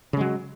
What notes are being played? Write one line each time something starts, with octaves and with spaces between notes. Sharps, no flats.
C#3 F#3 G#3